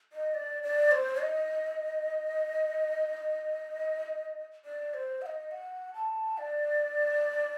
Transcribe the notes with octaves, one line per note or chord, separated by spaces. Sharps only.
D#5
D5
D5
C5
D#5
D5
C5
F#5
D#5
F#5
A5
D5